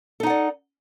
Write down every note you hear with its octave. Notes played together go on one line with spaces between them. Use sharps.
D#4 A4 D5 F#5